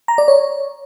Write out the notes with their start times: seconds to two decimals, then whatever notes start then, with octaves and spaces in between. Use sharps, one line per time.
0.08 A#5
0.18 D5
0.28 C#5